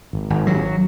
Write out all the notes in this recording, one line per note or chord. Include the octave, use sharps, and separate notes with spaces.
G#1
G#1
F#3